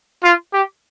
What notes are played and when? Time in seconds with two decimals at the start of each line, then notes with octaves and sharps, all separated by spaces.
0.24 F4
0.53 G4